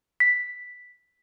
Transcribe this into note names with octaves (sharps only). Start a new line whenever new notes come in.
B6